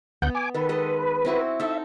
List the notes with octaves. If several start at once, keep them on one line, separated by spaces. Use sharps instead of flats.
D2 B3 F#5 G6
G#5 D6
D#3 A4 B4
G#3 A4 D#5
C4 E4 F#4
D#4 A4 E5